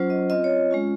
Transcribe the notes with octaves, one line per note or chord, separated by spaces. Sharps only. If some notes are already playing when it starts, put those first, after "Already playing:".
Already playing: F#3 C#4 F4 C5
D#5
C4 F4 D#5
C#5
G#3 C#4 F4